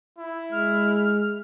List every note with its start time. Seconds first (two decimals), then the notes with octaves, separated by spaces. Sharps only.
0.18 E4
0.52 G#3 F6